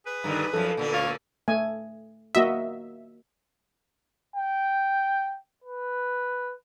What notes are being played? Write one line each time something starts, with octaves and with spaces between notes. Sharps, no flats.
G#4 B4
G2 D3 D#3
F#2 F3 A4
A#2 D3 B3
D2 C#5 F5
A3 G#5
A#3 F#4 D#5 E5
G5
B4